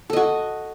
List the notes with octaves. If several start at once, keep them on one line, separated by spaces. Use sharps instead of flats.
F#4 A4 D#5